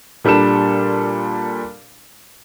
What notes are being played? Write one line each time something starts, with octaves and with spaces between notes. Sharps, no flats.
A#2 G3 D4 A4 E7